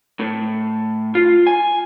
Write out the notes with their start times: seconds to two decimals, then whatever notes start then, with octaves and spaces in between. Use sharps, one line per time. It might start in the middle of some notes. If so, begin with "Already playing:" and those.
0.20 A2
1.15 F4
1.47 G#5